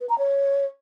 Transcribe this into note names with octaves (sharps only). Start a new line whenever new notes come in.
B4
A#5
C#5